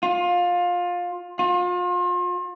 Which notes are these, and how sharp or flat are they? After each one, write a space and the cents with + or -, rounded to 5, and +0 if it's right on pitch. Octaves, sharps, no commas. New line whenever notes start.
F4 +20
F4 +35